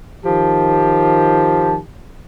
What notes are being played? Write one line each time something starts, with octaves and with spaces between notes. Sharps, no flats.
D#3 F3 G4 A5